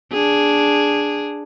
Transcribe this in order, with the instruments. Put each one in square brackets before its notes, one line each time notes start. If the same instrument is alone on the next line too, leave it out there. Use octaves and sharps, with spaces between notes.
[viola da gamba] D4 G#4